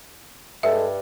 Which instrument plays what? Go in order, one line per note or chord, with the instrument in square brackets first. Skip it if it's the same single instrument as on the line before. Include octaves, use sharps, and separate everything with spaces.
[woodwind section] G2 [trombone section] G#3 A4 [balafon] E5